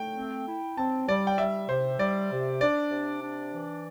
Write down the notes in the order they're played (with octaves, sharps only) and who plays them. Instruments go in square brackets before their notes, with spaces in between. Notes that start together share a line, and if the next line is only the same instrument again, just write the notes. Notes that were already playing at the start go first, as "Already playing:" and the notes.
Already playing: [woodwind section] A3 [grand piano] G5
[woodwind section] C4
E4
[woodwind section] C4 [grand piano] A5
[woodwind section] G3 [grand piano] D5
[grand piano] G5
[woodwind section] G3 [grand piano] E5
[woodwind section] C3 [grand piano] C5
[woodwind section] G3 [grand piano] D5
[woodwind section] C3
[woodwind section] D4 [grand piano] D5
[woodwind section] C3
D4
E3